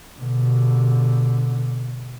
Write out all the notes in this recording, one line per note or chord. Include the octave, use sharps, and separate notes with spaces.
B2 D3